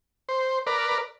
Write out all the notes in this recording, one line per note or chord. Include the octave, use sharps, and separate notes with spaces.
C5
A#4 B4 D5